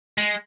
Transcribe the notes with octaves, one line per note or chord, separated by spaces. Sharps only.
G#3